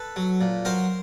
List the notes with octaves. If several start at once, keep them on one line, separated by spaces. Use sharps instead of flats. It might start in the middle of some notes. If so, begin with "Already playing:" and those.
Already playing: A4 B4
F#3
A#2
F#3 A#4 C5